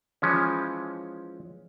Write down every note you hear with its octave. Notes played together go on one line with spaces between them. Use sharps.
E3 F3 G#3 C#4